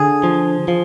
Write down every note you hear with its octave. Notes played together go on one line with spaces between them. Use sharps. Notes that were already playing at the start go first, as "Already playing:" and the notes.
Already playing: D3 G#4
F3
F3